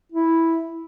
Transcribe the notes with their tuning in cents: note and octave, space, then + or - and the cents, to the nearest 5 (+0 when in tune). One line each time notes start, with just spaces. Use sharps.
E4 -5